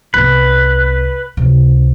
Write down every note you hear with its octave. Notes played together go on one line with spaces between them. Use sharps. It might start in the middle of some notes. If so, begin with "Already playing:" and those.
C2 B3 B4
C#2 C3